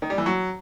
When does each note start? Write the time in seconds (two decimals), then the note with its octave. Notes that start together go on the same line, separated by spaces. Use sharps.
0.02 D#3
0.10 G3
0.18 E3
0.26 F#3